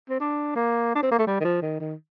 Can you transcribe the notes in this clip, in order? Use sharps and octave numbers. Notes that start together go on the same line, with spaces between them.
C4
D4
A#3
D4
C4
A#3
A3
G3
D#3
F3
D#3
D#3